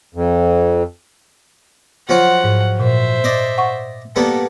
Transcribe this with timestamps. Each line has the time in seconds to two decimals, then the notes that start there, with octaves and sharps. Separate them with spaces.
0.15 F2
2.09 F3 F#3 F4 F#5
2.44 G#2
2.80 A#2 C5 E5
3.24 D5 D#5
3.58 F#5 C#6
4.16 G3 A#3 B3 A4